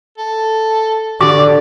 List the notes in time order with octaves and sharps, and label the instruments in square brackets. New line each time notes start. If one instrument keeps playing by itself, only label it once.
[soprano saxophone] A4
[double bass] D3 [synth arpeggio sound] F#4 G4 D6 [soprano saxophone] D5